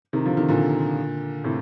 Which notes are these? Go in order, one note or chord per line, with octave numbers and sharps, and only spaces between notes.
C3 D#3
D3 F3
C3 D#3
A#2 D3
A2 C3